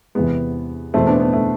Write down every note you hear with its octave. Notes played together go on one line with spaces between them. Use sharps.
E2 C3 G#3 B3
E2 B2 G#3 A3 C4
B3 D4
B3
A3